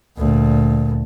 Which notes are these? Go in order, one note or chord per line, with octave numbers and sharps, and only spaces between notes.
D2 A#2